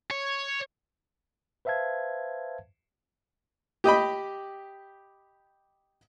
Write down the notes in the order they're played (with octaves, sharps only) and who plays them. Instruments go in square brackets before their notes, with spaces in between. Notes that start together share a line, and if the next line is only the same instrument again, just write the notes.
[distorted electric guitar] C#5
[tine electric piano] B4 C5 E5 F5 A5 G#6
[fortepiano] G4 D#5 G5 B5